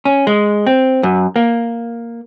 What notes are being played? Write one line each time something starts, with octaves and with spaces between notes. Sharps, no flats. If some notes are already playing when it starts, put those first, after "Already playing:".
C#4
G#3
C4
F#2
A#3